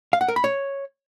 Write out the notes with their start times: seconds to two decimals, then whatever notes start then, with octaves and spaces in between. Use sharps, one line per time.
0.13 F5
0.21 F#5
0.28 A#4
0.36 B5
0.44 C#5